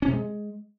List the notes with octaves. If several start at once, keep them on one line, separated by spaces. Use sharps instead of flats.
C#4
C3
G#3